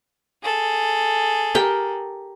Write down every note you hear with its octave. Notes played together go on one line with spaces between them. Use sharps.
G#4 A4
G4 A#4 G5